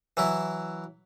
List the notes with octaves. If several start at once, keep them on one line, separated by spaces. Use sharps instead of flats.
E3 F#3 E4